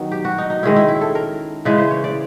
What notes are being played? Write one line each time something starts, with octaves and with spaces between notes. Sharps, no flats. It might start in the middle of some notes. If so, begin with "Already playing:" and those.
Already playing: D#3 F#3 B3
G4
F#4
D#4
D#4
D#3 G#3 C#4 E4
E4
E4
A4
A#4
C#3 E3 G#3 B4
C5
C#5
D5